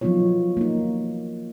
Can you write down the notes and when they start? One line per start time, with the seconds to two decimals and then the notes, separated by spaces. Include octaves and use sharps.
0.01 F3 F#3 B3 D#4 F4 C#5
0.57 A#3 D#4